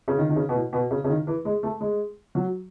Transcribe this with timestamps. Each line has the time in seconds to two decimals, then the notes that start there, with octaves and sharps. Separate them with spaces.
0.08 C#3
0.18 D#3
0.29 D#3
0.36 C#3
0.49 B2
0.55 A2
0.73 B2
0.91 C#3
1.04 C#3
1.09 D#3
1.27 E3
1.45 G#3
1.63 A3
1.81 G#3
2.35 F#3